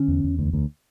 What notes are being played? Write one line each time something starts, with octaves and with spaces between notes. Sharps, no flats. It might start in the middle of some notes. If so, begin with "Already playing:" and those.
Already playing: D3 C#4
E2
E2
D2
D2